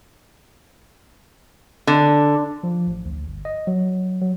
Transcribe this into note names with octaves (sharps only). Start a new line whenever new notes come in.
D3
F3
A1
D2
G1
D#5
F#3
F#3